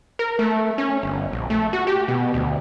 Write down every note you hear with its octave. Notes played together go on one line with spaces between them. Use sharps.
A#4
A3
C#4
G1
A#1
A3
F#4
G4
B2
D2